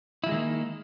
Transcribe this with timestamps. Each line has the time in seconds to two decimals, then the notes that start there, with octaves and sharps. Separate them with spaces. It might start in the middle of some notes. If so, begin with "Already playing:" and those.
0.24 E4
0.26 F3
0.29 G#3
0.32 D#3
0.34 A#3